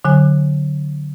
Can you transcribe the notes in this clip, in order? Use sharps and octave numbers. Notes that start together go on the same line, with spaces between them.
D3 F#3 G#5 F#6